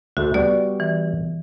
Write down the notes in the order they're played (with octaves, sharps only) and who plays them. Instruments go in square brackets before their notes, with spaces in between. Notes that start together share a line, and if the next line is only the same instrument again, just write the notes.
[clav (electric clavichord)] D2 A3 [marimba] F#4
[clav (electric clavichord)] G3 B3 F#4 [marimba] D5
[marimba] E3